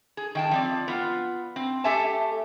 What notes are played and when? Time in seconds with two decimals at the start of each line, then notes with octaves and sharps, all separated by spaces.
0.17 G#4
0.35 D#3 G5 A5
0.51 F3 C4 D5
0.88 B3 F4
1.56 C4
1.84 A3 G4 A4 E5 G#5 A5